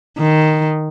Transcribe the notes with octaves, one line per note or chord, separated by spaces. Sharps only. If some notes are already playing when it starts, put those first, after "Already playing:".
D#3